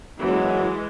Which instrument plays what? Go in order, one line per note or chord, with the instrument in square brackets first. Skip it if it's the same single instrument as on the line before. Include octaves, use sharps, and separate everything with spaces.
[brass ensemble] F#1 F#3 [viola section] E3 G#3